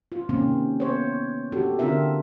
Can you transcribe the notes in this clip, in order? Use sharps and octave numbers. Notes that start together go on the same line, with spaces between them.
F4
C3 D#3 A#3 C4 C#4
B3 C5 C#5
D4 F#4 G4 A4
D3 C4 D4 F4 A#4 E5